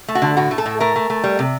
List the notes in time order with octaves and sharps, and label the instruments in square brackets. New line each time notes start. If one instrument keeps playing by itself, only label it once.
[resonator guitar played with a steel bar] A3
F#4
D3
A2 F#4
A3
A4
A2
A3 A#4
A3
A3
G3
C3